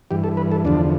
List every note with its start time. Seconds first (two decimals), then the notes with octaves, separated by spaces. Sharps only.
0.11 G2 E3 G4
0.24 A4
0.37 B4
0.52 A4
0.65 E2 D3 F3 D4